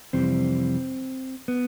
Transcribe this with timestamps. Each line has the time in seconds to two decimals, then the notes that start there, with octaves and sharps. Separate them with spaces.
0.13 F2 C3 E3 G3 C4
1.48 B3